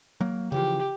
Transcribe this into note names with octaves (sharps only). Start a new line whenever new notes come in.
F#3 A#3
C#3 E3 F3 G4